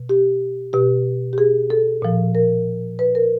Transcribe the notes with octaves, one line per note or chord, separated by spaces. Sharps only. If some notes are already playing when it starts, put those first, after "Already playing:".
Already playing: B2
G4
B2 G4
G4
G#4
A4
A#2 F3
A#4
B4
A#4